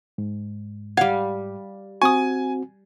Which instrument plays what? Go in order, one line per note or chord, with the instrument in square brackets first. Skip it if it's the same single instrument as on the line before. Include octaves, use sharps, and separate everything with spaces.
[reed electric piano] G#2
[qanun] G3 F5 [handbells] F#5 G#6
[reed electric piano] C4 F#4 [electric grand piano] G#5 [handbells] C#6 D#6